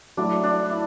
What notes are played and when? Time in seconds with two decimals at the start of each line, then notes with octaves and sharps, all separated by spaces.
0.17 F#3 A3 D4 E4
0.44 D4
0.71 E4